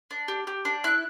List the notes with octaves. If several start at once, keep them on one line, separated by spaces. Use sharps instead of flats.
D4
G4
G4
D4
E4 F#6